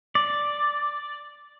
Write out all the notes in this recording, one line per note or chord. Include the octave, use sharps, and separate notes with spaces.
D5